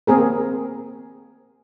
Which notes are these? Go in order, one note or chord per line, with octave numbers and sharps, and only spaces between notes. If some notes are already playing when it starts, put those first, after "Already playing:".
A#3 C4 G#4 A#4